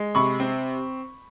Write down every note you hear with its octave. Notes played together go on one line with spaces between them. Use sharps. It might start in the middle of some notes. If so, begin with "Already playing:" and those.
Already playing: G#3
C3 B5 C#6
C4